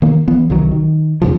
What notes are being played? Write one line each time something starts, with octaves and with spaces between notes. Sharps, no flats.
D#3 A#3
E3 F3 B3
C2 D#3 F#3
D#3
E2 G#2 C#3 F3